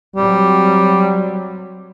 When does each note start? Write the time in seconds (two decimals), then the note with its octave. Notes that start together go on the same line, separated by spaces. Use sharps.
0.16 F#3 G3 C4